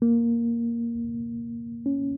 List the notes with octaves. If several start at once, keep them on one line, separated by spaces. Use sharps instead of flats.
A#3
C#4